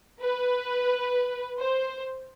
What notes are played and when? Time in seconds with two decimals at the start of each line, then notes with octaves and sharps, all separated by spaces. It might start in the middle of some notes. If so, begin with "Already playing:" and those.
0.22 B4
1.59 C5